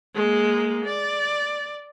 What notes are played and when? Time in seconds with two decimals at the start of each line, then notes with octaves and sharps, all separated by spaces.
0.15 G#3 A#3
0.84 D5